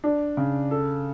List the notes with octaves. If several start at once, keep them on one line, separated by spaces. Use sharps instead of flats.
D4
C#3
A4